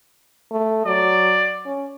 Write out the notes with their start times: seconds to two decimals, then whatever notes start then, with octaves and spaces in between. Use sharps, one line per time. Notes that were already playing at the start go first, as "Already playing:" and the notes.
0.52 A3
0.86 F#3 D5
1.66 C#4